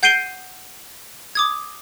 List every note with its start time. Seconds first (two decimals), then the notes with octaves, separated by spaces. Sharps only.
0.03 F#5 G6 C7 D7 D#7 G7
1.35 D6 D#6 G#6